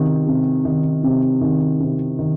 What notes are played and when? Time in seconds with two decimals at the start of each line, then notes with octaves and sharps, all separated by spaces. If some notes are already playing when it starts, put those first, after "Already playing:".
Already playing: C3 D#3
0.27 C3
0.65 D#3
1.03 C3
1.41 D#3
1.80 C3
2.19 D#3